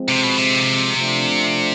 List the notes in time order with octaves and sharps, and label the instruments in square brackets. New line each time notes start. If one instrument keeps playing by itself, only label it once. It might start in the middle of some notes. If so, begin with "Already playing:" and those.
Already playing: [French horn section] F3 G#3 C4
[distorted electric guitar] C3
B2
C3
[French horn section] F3 A3 D4